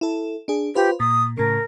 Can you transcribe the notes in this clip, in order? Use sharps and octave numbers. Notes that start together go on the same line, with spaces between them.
E4 A4
D4 G#4
F4 G4 B4 C5
A#2 D#6
A2 C#3 A#4